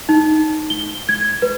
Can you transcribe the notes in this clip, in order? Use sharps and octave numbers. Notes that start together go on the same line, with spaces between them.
D#4
G7
G#6
B4